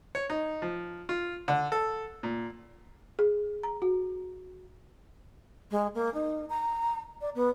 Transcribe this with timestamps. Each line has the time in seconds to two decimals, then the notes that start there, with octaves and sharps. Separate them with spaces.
0.15 C#5
0.30 D#4
0.62 F3
1.09 F4
1.48 D3
1.72 A4
2.23 A#2
3.19 G#4
3.63 A#5
3.82 F#4
5.71 G#3
5.95 A#3
6.14 D#4
6.50 A#5
7.21 D5
7.35 B3